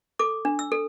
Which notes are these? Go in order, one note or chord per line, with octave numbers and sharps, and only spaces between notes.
A4 D6
D4
E6
A4